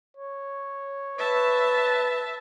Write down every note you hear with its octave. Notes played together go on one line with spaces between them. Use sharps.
C#5
B4 E5 A5